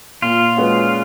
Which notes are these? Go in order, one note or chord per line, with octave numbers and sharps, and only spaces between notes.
A#2 F4
G#3 C#4 F#4 B4